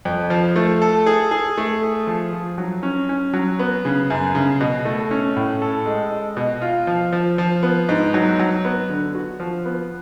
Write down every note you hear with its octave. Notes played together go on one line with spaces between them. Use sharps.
F2
F3
A3
A4
G#4
G#4
A3
G#4
F3
F3
F#3
C#4
C#4
F#3
B3
C#3
F#2
C#3
B2
A3
C#4
A2
A4
G#3
G#3
B2
F4
F3
F3
F3
B3
G#2
F#3
F#3
B3
D3
F#4
F3
B3